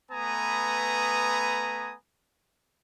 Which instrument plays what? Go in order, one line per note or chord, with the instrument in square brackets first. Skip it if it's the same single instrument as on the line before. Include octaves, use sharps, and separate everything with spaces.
[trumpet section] A3 B3 B4 G#5 A#5 D#6